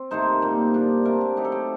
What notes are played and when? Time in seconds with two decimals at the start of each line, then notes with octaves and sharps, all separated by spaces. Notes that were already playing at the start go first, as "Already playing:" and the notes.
Already playing: C4
0.11 C3 D#3 A3 D#4 C5
0.42 A#2 G3 A#3
0.74 A#2 G3 D4
1.05 D3 A3 C4 A#4
1.21 G4
1.37 F#3 A3 D#4 G4
1.45 A4
1.52 G4